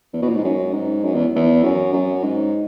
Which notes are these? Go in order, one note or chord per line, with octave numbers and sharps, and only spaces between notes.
E2
B2
A#2
G#2
F#2
G#2
F#2
E2
E2
F#2
F#2
G#2